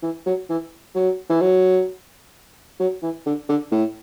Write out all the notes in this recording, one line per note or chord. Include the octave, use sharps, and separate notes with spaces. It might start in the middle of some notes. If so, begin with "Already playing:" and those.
E3
F#3
E3
F#3
E3
F#3
F#3
E3
D3
D3
A2